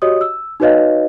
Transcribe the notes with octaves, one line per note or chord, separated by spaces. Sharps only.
F#4 G4 C#5 D#5 D#6
E6
D#4 F#4 B4 C#5 D#5 F5